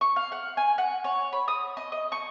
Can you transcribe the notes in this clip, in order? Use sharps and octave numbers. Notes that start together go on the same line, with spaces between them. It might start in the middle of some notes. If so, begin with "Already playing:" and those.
C#6
F5
F#5
G#5
F#5
C#5
B5
D#6
D#5
D#5
C#6